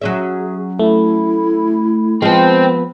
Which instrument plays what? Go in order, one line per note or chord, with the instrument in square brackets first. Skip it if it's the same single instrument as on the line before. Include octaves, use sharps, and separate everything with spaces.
[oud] F#3 C#4 E5 [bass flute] G#4
[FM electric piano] A3 [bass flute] E4
[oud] F3 B3 [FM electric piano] G#3 [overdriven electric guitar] C4